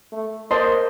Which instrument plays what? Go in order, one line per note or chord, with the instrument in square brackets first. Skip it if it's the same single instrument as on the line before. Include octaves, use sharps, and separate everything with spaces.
[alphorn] A3
[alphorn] A#3 [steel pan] C5 D#5 A5 C6